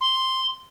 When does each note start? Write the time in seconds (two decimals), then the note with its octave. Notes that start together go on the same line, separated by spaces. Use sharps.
0.01 C6